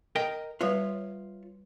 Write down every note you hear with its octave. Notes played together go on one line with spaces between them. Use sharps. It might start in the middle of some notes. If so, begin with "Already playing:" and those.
A#4 D#5 G5
G3 F4 B4 C#5 E5